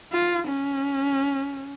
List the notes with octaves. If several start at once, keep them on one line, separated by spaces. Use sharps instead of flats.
F4
C#4